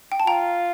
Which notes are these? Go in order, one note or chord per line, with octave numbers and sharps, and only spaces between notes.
G5
A5
F4 G5 A#5